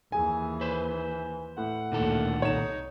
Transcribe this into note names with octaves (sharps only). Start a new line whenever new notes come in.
D#2 E3 G#4 G#5
B4 C5
A2 F#5
D2 A#2 D#3 A#3 A4
C2 D#4 C#5 C#6 E7